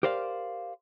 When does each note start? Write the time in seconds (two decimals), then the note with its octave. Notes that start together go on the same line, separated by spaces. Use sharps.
0.03 G4 A#4 C5 D5 F5